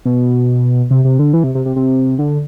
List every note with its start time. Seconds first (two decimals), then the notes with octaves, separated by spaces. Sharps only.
0.05 B2
0.91 C3
1.04 C3
1.19 D3
1.33 E3
1.44 C3
1.55 C3
1.65 C3
1.76 C3
2.19 D3